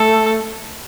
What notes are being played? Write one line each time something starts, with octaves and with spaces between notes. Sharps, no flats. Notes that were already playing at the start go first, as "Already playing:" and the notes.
Already playing: A3 A4